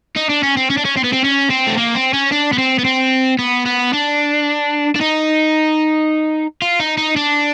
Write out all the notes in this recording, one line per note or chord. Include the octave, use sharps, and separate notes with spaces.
D#4
D4
C#4
C4
C#4
D4
C#4
C4
B3
C4
C#4
C4
A3
A#3
C4
C#4
D4
B3
C4
B3
C4
B3
B3
D4
D4
D#4
F4
D#4
D#4
D4